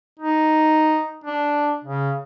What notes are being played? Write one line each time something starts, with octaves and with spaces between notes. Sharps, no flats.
D#4
D4
C#3